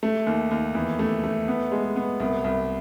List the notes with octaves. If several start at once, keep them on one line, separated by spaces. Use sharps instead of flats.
A3
D#2
D#2
E2
A3
A3
B3
G#3
B3
C2
C2